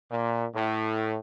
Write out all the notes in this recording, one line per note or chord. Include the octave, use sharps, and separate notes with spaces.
A#2
A2